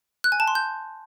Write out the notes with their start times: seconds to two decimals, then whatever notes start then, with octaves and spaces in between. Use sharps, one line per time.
0.24 F#6
0.32 G#5
0.40 A5
0.48 C6
0.55 G6